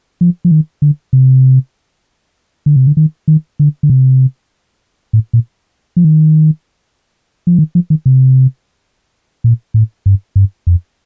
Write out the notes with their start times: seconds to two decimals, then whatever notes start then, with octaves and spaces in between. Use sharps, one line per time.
0.21 F3
0.45 F3
0.51 D#3
0.82 D3
1.13 C3
2.66 D3
2.76 C3
2.87 D3
2.97 D#3
3.28 D#3
3.59 D3
3.83 D3
3.90 C3
5.13 A2
5.33 A#2
5.97 F3
6.05 D#3
7.47 F3
7.59 D#3
7.75 F3
7.90 D#3
8.06 C3
9.44 A#2
9.74 A2
10.06 G2
10.36 G2
10.67 F2